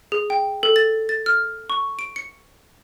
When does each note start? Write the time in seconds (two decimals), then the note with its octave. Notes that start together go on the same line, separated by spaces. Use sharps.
0.12 G#4
0.30 G5
0.63 A4
0.76 A6
1.09 A6
1.26 F6
1.70 C#6
1.99 D7
2.16 C#7